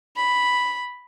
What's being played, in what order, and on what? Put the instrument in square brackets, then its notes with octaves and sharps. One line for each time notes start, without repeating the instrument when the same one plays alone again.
[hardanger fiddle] B5